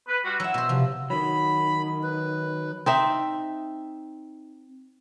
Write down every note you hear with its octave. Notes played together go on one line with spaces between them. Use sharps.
B4
G3 F4 F#4
F#3 E4 E6
B2 C5
C3 F3
D#3 F#3 B5
B4
C4 D#4 E5